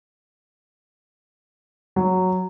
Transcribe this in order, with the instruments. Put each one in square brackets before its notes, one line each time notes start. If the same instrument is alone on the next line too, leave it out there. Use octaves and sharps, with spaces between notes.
[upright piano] F#3